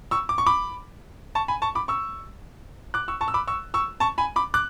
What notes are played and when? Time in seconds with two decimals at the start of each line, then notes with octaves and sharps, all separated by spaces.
0.11 C#6 E6
0.29 D6
0.38 C#6
0.46 B5 D6
1.35 A5 C#6
1.48 G#5 B5
1.62 A5 C#6
1.75 B5 D6
1.88 C#6 E6
2.94 D6 F#6
3.08 C#6 E6
3.21 A5 C#6
3.28 E6
3.34 B5 D6
3.47 C#6 E6
3.74 C#6 E6
4.00 A5 C#6
4.18 G#5 B5
4.36 B5 D6
4.54 D6 F#6